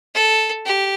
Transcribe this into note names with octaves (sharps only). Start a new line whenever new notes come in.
A4
G4